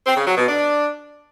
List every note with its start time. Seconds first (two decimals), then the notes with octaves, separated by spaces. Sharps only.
0.07 C4
0.17 C#3
0.27 F#3
0.37 B2
0.48 D4